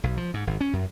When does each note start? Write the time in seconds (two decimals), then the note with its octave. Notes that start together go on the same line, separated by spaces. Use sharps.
0.03 B1
0.17 F3
0.34 G#2
0.47 G#1
0.61 C#4
0.73 F#2